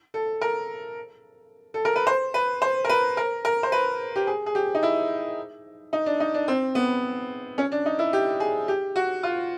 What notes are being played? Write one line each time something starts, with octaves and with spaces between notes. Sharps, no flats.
A4
A#4
A4
A#4
B4
C5
B4
C5
A#4
B4
A#4
A#4
C5
B4
G4
G#4
G#4
G4
D#4
E4
D#4
D4
D#4
D4
C4
B3
C#4
D4
D#4
E4
G4
G#4
G4
F#4
F4